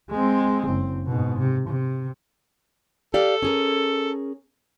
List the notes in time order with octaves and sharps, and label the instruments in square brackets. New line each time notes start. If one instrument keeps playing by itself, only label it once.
[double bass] G#3 C4
F#1 C4
G#2 B2
C3
C3
[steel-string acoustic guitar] G4 D5 F5 [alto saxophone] A4
[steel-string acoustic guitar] C#4 G#4 A#4